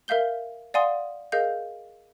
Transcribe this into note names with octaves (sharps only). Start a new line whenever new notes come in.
A#4 E5 F5 G6 G7
D5 F5 F#5 G#5 C6 D#6
G#4 A#4 D#5 F5 G6